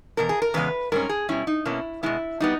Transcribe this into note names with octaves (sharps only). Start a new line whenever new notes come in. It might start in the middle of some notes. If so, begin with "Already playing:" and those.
E2 B2 A#4
G#4
A#4
E2 C#3 G#3 B3 B4
G#2 G3 C#4 A#4
G#4
B2 G3 C#4 E4
D#4
B2 A#3 C#4 E4
B2 G#3 B3 E4
G3 B3 D#4